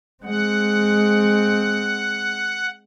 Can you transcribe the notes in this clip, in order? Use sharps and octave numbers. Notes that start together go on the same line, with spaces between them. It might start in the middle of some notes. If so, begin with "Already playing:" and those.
G#3 C4 F#5